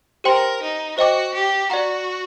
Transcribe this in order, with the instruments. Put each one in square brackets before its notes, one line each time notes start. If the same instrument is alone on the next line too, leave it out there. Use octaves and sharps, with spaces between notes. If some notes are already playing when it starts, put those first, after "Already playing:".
[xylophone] G4 C5 G5 C6 [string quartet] A#4
[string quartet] D#4
[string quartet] F#4 [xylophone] C5 D#5 G5 D6
[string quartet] G4
[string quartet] F#4 [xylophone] D5 F#5 A#5